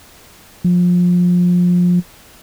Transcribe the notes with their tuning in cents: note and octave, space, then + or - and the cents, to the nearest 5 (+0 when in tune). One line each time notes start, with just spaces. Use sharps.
F3 +25